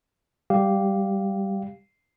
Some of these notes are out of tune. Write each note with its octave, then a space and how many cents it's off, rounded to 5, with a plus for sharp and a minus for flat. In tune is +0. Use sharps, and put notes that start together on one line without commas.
G3 +0 G4 -5 F5 +0